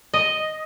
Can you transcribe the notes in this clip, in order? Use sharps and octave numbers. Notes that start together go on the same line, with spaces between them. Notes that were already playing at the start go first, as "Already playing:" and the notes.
D#5